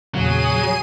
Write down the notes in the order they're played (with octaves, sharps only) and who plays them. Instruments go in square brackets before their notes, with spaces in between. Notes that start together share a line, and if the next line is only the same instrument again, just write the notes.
[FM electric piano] E2 A#2 C#3 [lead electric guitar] F#3 [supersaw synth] G#4 C7 D#7